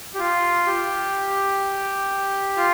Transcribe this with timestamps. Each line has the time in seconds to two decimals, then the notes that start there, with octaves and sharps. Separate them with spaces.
0.15 G4
0.19 F4
0.66 G4
2.57 F4